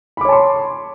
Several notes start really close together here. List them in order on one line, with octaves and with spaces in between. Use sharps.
B5 D6 C#5 A5 C6